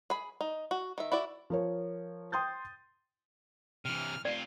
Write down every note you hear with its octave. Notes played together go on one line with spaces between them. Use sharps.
G#4 B5
D#4
F#4
D#3 E5
E4 F#4 D5
F3 A#4 C#5
G5 C6 D#6 G6 A6
C3 E3 F6
C3 F4 D5